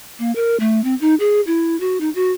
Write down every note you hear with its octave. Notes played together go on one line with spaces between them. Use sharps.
A#3
A#4
A3
C4
D#4
G#4
E4
F#4
D#4
F#4